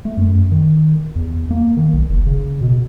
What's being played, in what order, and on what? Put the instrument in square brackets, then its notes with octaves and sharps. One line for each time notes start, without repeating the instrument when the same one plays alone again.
[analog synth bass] A3
F#2
D#3
E2
A#3
D#3
B1
F#1
C#3
B2